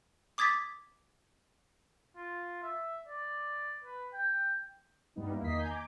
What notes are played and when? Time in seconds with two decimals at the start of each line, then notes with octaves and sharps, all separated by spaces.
0.38 D6 D#6 G#6 A6 B6
2.17 F4
2.63 E5
3.08 D5
3.84 B4
4.13 G5
5.16 G2 G3 B3 D#4
5.30 A#3 E4
5.42 E2 D#3 A#3 D#5 B6 C7
5.57 G#5 A#5 G6 G#6
5.70 D6